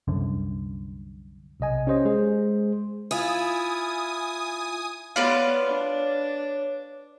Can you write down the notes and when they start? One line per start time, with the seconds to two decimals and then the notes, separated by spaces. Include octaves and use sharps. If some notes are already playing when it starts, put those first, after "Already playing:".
0.08 C2 F#2 D3
1.60 B1 C3 D#5 G#5
1.87 C#4 G4 C5 D#5
2.05 G#3 G#4 C5
3.11 E4 F4 G#5 D#6
5.16 B3 F4 B4 C#5 D5 F5
5.66 D4